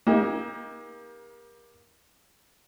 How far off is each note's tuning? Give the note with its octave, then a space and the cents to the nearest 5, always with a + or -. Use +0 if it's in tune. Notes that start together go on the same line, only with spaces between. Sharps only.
A#3 +25 D#4 +40 G4 +40